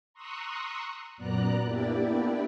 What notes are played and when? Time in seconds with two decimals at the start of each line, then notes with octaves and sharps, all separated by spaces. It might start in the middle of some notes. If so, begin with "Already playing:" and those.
0.14 A#5 C6 C#6 D#6 E6 F#6
1.17 F#2 A#2 B3 D5 A#5 F#6
1.63 A#3 B3 D4 E4 G4 D5